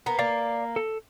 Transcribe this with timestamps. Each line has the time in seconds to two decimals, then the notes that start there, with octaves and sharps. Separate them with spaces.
0.06 A#3 B3
0.19 A#3 D5 F5
0.76 A4